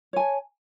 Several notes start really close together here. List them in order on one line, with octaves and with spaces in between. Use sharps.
C#5 G#5 A5